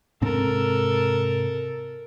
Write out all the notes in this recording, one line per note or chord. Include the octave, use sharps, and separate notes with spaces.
G#2 C3 C4 A4 A#4